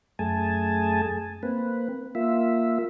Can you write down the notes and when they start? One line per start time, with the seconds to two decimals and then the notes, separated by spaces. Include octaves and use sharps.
0.19 F#2 A3 G#4 G#5 A5
1.43 A#3 C4 B4
2.15 A#3 F4 E5